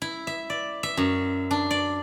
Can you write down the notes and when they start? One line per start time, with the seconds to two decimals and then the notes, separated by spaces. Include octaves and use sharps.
0.02 E4
0.27 E5
0.50 D5
0.83 E5
0.97 F#2
1.51 D4
1.71 D5